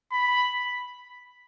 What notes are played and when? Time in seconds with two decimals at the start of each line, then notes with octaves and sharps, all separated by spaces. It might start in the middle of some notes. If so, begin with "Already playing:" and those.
0.12 B5